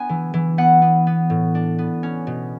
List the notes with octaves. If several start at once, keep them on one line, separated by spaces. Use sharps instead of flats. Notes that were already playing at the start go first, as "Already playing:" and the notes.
Already playing: B3 D4 G#5
E3
E3
B3 F#5
B3
B3
A2
D4
B3
C#4
B2